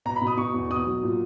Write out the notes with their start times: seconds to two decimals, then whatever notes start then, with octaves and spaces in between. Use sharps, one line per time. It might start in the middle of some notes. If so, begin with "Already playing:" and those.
0.05 B2 A#5
0.16 B5
0.21 B2
0.27 D#6
0.37 B2 C#6
0.54 E2
0.71 B2 D#6
0.87 F#3
1.03 A#2